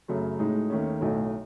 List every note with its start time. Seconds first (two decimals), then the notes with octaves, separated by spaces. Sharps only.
0.08 F#2 C#3 F#3 A3
0.39 A2 G#3 D#4
0.70 D#2 D#3 A3 C#4
1.01 B1 A2 F#3 A3